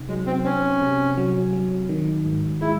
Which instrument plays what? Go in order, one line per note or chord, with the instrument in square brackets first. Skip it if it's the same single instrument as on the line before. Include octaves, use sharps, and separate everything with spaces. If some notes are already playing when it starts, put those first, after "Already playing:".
Already playing: [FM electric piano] C3 D#4
[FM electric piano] F#3 [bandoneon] G#3
[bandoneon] C4
[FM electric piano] C4 [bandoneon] C#4
[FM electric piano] C3
F#3
F#3
D#3
G#2
[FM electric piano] G#3 [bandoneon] E4